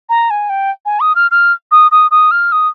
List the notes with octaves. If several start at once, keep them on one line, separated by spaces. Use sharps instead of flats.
A#5
G#5
G5
G#5
D#6
F6
F6
D#6
D#6
D#6
F6
D#6